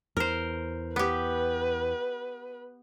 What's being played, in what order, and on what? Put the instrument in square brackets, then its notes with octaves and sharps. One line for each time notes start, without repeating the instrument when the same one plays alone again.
[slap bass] E2 [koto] A#4 C5
[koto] B3 G4 [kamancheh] B4